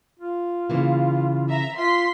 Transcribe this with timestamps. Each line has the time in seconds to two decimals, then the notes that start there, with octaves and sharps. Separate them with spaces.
0.19 F4
0.70 C#3 E3 A#3
1.50 E5 A#5
1.79 F4 C6 B6